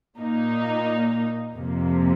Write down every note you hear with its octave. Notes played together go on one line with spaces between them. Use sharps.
A#2 A#3 D#4
F2 C3 F3 A#3